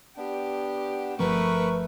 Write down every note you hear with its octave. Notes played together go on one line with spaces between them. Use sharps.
B3 D4 G4
G1 F3 A3 C4 A#4 B4 B5 C#6